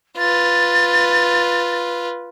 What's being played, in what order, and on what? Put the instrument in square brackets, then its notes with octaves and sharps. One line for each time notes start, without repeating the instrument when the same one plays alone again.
[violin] F4 B4 [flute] A6